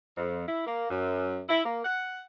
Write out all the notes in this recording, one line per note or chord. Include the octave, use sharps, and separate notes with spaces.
F2
E4
A#3
F#2
E4
A#3
F#5